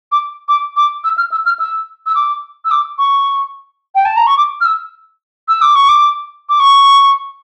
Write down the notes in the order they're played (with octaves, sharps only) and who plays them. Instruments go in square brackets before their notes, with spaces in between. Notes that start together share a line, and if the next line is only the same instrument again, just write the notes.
[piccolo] D6
D6
D6
E6
F6
E6
F6
E6
E6
D6
E6
D6
C#6
G5
A5
A#5
C#6
D6
F6
E6
E6
D6
C#6
D6
D6
C#6